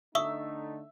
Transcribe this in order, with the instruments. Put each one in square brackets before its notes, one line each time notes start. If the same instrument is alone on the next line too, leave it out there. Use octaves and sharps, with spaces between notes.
[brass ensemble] D3 A3 D#4 [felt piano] E5 [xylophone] C#6 D#6 E6